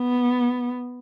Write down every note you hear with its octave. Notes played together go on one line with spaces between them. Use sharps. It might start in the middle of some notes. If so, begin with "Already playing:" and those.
Already playing: B3